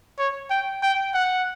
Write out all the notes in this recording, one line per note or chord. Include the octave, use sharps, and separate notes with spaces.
C#5
G5
G5
F#5